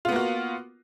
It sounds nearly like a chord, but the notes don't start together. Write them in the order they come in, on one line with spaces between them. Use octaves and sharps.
F4 B3 A#3 F#4